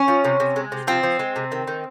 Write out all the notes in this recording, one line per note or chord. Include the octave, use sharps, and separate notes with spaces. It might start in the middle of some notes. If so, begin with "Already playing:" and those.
Already playing: C#4
F3
C3
C3
G#3
C3
F3 C4
F3
G#3
C3
D#3
D#3